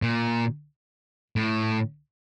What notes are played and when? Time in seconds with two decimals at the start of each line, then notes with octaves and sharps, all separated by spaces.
0.02 A#2
1.36 A2